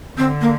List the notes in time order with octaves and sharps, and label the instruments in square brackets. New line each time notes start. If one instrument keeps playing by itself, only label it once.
[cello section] D3 [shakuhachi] C4
[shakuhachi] A#3